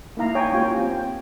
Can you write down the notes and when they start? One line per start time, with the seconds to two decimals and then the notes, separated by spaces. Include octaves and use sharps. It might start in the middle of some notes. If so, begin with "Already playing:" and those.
0.17 A#3 D#4 E4 F5 A#5
0.35 C#5 G5 G#5
0.53 A#3 C#4 F4 G4 C#5 G5
0.77 A#3 C4
0.91 G5